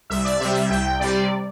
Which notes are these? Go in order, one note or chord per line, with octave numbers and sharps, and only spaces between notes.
C2 E5
D5
C3 G3 E5
E5
C2 G5
C3 G3 D5